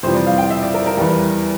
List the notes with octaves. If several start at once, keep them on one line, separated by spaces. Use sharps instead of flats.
F2 C3 E3 G3 C5
D5
F5
G5
E5
D5
A#4
A#4
E2 E3 G3